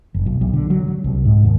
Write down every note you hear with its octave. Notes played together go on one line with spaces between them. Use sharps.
F#1
B1
B1
D3
F#3
F#3
C2
G#2
D#2